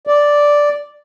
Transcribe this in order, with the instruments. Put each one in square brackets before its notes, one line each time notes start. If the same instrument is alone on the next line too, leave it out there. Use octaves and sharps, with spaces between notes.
[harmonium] D5